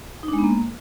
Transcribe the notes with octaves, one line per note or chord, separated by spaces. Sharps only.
D#4
D4
G#3
B3
A#3